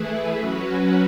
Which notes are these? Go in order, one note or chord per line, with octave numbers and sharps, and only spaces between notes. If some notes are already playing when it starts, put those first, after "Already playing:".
Already playing: E3 A3 E4 G#4 B4
F#3 C#4 F#4 B4